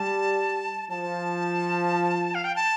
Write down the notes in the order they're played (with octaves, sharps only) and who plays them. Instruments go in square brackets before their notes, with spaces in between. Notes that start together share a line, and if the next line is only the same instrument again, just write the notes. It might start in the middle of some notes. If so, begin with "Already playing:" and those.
Already playing: [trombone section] G3 [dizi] A5
[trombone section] F3 [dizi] A5
[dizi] F5
G5
A5